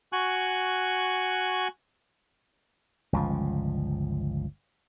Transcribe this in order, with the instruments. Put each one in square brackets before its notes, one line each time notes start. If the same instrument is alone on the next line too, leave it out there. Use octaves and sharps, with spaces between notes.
[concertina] F#4 G#5 C#6 F#6
[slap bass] G1 C#2 F3